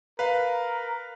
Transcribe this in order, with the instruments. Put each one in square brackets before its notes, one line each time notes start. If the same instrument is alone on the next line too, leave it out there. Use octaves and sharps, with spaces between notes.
[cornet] A#4 [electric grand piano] B4 F5